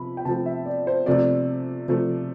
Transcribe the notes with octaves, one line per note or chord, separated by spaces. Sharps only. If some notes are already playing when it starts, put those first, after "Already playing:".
Already playing: C3 F3 B5
G5
C3 F3 A3 A5
E5
D5
C5
C3 F3 A3 D5
C3 F3 A3